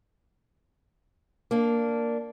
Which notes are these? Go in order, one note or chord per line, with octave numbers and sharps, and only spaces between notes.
A#3 D4